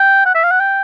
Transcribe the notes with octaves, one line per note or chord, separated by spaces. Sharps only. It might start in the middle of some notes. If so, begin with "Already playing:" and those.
Already playing: G5
F#5
E5
F5
F#5
G5